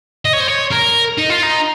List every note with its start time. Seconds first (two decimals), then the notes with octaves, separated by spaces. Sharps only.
0.25 D#5
0.33 C#5
0.40 C5
0.48 C#5
0.71 A#4
1.18 D#4
1.30 F4
1.43 D#4